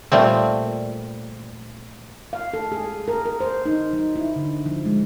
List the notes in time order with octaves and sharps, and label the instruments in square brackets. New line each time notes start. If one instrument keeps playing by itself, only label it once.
[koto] A#2 G3 A3 C4
[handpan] F5
A4
G#4
A#4
A#4
C5
D#4
F#3
E4
D3
F3
G#3